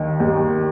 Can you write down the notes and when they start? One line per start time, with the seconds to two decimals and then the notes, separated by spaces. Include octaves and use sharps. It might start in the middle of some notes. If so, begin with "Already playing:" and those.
Already playing: D#2 D#3
0.20 D#2